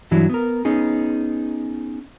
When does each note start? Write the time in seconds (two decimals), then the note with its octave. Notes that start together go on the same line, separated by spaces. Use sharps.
0.11 G2 E3 F#3 D4 E4
0.30 B3 A#4
0.65 B3 C#4 D#4 G#4